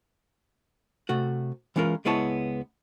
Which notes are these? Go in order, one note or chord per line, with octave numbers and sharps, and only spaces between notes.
C3 A3 F#4
E3 G#3 C#4 F4 A#4
C#2 G#3 B3 E4 C#5 A5